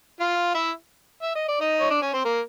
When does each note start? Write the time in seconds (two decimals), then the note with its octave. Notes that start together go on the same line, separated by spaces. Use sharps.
0.20 F4 F5
0.54 E4 E5
1.22 E5
1.36 D#5
1.48 D5
1.61 D#4 D#5
1.80 C#5
1.90 D4 D5
2.02 C#4 C#5
2.14 C4 C5
2.25 A#3 A#4